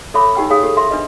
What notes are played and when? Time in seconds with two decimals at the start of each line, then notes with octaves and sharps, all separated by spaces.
0.14 A4 C#5 E5 B5 D6
0.35 D#4 G4 G5 E6
0.50 G#4 C#5 F5 D#6
0.63 G4 A4
0.77 A#4 E5 C6
0.91 D4 B4 D#5